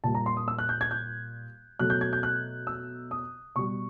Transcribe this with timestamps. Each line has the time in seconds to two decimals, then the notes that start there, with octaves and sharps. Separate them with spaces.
0.04 A#2 G3 A5
0.15 A#5
0.26 C6
0.37 D#6
0.48 E6
0.58 F#6
0.69 G6
0.81 G#6
0.91 G6
1.79 B2 F#3 A3 F#6
1.90 G6
2.01 G#6
2.13 G6
2.23 F#6
2.67 E6
3.11 D#6
3.55 B2 G3 C#6